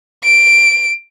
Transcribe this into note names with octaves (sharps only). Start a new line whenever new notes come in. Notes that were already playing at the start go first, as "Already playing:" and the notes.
D7